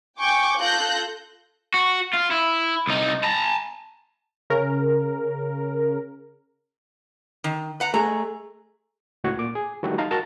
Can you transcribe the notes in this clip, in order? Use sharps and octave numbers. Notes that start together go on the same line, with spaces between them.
G5 G#5 C#6 D6 G6
F4 A4 F#6 G6 A#6
F#4
F4
E4
C2 D#4
A5 A#5
C#3 A#4
D#3
B4 F#5 A#5
A3 G#4 A#5
C#2 A2 F#4 C#6 G#6
A#2 D6
G#4
D#3 F3 G3 A3 F#4 G4
D#4 F5 A5 A#5
F#4 A#4 A5 A#5